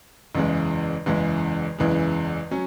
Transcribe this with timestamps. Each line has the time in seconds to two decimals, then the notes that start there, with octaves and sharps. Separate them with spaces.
0.35 F#1 E2 C#3 E3 G#3
1.06 F#1 E2 C#3 E3 G#3
1.79 F#1 E2 C#3 E3 G#3
2.51 F#3 C#4